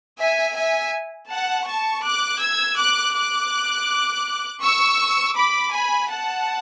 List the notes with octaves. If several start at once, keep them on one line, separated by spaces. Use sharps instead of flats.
E5 G#5
E5 G#5
F#5 A5
A5 C#6
D6 F#6
E6 G#6
D6 F#6
D6 F#6
C#6 E6
B5 D6
G#5 B5
F#5 A5